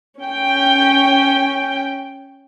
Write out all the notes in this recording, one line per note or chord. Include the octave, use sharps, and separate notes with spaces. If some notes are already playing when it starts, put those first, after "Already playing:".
C#4 G5